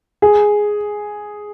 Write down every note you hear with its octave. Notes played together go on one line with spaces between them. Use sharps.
G#4